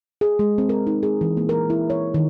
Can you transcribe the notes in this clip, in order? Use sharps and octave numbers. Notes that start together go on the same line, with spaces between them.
G#4
G#3
C4
A#4
D#4
G#4
E3
A#3
A#4
E4
C#5
D#3